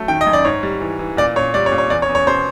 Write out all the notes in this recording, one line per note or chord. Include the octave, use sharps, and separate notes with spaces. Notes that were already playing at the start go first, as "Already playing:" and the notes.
Already playing: F#3 A3
D#3 G5
D#5
F#2
D5
G#2 C#5
G3
E3
E3
A#2 D5
A#2 C#5
G3 D5
C#5
A#2
C#5
E2 D5
C#5
E2
C#5
B2 C5